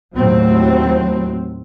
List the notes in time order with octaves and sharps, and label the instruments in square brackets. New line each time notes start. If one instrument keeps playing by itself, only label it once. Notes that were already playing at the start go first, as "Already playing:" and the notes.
[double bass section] D#2 A2 F#3 C4